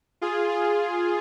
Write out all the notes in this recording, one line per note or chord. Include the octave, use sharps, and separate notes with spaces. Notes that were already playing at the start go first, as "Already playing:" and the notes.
F4 G#4
F4 G#4